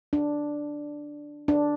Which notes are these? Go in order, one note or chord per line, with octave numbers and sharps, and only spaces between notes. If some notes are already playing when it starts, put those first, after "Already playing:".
D4
D4